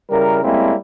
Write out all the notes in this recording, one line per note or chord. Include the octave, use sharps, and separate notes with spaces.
C#3 G3 E4 A#4
G3 G#3 A#3 C4 C#4 E4